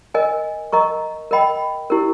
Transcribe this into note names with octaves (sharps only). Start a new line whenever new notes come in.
A#4 D#5 G#5
A#4 D#5 A#5 C#6
A#4 D#5 G5 B5
E4 G4 A#4